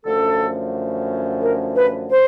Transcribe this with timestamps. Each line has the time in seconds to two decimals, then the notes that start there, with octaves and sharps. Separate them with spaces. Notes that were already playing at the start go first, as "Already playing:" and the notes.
0.05 F#2 D3 F3 A3 C#4 A4
1.42 A#4
1.76 B4
2.11 C5